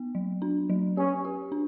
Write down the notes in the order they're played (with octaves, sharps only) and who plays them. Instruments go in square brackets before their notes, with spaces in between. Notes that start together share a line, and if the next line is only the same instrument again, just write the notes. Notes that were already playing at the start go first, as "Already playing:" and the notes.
Already playing: [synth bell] B3
F#3
D4
F#3
[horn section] C#4 [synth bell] G4
[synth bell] G4
D4